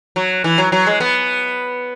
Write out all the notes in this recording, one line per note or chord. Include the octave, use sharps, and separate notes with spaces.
F#3
E3
F#3
F#3
G#3
B3